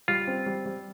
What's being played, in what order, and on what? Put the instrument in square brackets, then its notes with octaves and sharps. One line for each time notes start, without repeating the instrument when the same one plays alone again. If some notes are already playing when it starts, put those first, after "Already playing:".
[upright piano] G3 [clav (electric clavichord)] F4
[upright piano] C4
G3
G3